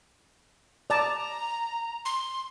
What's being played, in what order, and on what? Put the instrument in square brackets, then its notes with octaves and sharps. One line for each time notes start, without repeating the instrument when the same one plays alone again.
[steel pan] D5 A5 [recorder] A#5
[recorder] C6